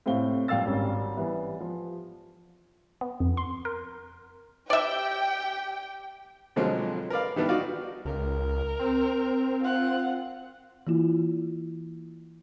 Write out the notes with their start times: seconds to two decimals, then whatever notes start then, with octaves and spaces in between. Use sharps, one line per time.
0.06 A2 C3 C4 F5 G7
0.48 G2 A#2 F5 G5 E6 A6
0.66 G#1 G3 C#4
1.17 E3 G3 B3
1.60 F3
3.01 B3
3.20 F2
3.37 C6
3.65 A#4
4.70 G4 D5 E5 G5
6.56 B2 D3 F3 F#3 G#3 C4
7.10 A#4 B4 D5 F5
7.36 D#3 G3 B3 D4 E4
7.49 D#4 F4 F#4 D5 F5
8.05 C#2 A#4
8.79 C4
9.63 F4 F#5
10.87 E3 A#3 E4 F4